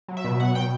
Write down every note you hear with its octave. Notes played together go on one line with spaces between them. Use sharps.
F#3
E5
B2
F#3 F#5
B2 G5